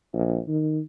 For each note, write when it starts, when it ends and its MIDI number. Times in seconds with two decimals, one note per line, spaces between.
0.13 0.39 34
0.48 0.80 51